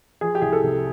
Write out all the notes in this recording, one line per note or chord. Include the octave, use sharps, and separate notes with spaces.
F3 G#4
G4
C2 G#4
A4
C3